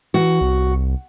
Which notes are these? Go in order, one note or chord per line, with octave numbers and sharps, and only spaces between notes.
E3 F#4
C2